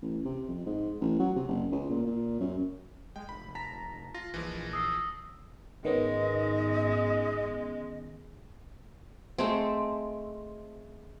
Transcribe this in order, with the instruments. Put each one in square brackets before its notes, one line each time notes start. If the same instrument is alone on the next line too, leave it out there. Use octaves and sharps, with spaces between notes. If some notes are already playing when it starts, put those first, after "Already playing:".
[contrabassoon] A1
C3
F2
G#2
A1
F#3
C3
F#1
C#2
A#2
A#2
F#2
[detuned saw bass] G#3 [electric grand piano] G5
[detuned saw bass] F1 [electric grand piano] B5
[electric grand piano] A5 A#5 B6
[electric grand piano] F4 [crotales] A#6
[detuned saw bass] A#1 [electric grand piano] E3 F3 G#3
[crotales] D#6 E6 C7
[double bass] G#1 G#2 [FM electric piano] D#3 B3 C#4 [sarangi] G#3 [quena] D#5
[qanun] G#3 A3 C4